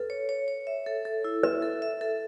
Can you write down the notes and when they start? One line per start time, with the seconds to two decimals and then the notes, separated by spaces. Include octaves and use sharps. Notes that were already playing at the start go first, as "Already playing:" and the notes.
Already playing: A4 B4
0.10 C#5
0.29 C#5
0.48 C#5
0.67 E5
0.86 A4
1.05 A4
1.24 E4
1.43 B4 E5
1.62 A4
1.82 E5
2.01 A4